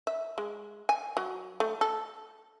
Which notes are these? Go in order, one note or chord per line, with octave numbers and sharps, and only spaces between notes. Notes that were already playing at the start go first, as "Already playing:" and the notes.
E5
G#3
G#5
F#3
A3
A4